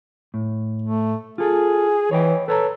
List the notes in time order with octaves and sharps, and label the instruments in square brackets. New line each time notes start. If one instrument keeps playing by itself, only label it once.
[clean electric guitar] A2
[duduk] A3
[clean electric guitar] F4 A4 [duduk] G#4
[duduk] E3 [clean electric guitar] C#5 D#5 G5
[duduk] A4 [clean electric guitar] B4 C#5 A#5